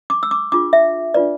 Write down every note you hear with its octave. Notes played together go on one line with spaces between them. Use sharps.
D6
E6
D6
D4 F4 G#4 D6
E5
D4 F4 B4 D5